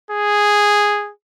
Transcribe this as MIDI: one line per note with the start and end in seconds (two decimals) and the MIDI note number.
0.11 1.11 68